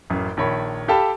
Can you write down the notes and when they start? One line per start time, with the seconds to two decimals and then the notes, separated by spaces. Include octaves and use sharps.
0.10 A1 F#2
0.37 A#1 D#3 C#5 B5
0.88 G4 A4 F5 G5 A5 B5